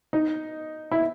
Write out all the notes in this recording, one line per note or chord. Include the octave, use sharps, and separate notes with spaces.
D#4
E4